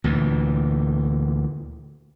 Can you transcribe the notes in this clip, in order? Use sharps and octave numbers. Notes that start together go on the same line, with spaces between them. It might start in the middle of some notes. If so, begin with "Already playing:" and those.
D2 A#2 E3